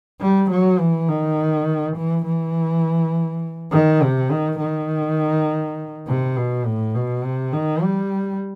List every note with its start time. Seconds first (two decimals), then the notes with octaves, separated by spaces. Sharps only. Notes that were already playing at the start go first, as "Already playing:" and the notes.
0.21 G3
0.51 F#3
0.79 E3
1.09 D#3
1.97 E3
2.26 E3
3.72 D#3
4.02 C3
4.31 D#3
4.60 D#3
6.07 C3
6.36 B2
6.65 A2
6.95 B2
7.24 C3
7.53 D#3
7.82 G3